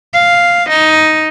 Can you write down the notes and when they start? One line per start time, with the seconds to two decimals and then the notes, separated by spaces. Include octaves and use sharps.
0.14 F5
0.69 D#4